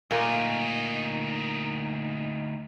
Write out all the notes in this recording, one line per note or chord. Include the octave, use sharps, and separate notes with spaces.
D2 A#2 A#3 D#4